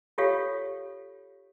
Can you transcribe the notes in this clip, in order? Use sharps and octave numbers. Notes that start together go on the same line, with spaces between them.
F4 G4 A4 C#5 F5